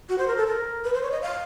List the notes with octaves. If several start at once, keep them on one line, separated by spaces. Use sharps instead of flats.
F#4
C5
A#4
A4
A#4
B4
C5
C#5
D#5
F5